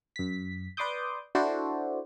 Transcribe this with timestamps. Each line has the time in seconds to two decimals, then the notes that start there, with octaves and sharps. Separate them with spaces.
0.16 F#2 B6
0.77 B4 D5 C6 D6 D#6 G6
1.35 D4 E4 F#4 A4 C5 D5